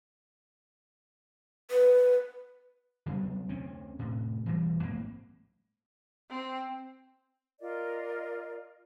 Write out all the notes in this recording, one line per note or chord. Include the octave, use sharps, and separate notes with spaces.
B4
C3 F#3 G3 B3
D2 C4 C#4
A2 C3
E1 E3 F#3 G3
A1 G#2 A#3 C4
C4
F4 A#4 D5 D#5